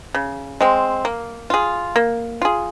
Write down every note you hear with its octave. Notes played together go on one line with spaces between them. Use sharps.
C#3
G#3 C4
A#3
F4 G#4
A#3
F4 G#4